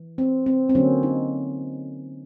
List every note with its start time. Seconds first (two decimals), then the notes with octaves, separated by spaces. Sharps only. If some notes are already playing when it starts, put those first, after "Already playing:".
Already playing: E3
0.18 C4
0.46 C4
0.69 C4
0.75 D3 F#3 A#3 C#4
1.03 D#4